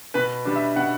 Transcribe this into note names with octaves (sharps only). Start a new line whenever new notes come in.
B2 B4 B5
G3 D4
E5
B2 F#5